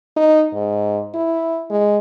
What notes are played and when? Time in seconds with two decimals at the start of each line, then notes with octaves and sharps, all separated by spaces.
0.16 D#4
0.53 G#2
1.15 E4
1.70 G#3